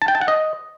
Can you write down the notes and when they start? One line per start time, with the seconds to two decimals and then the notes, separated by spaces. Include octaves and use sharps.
0.02 A5
0.08 G5
0.15 A5
0.21 F#5
0.28 D#5